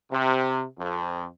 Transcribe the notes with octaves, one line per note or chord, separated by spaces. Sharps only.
C3
F2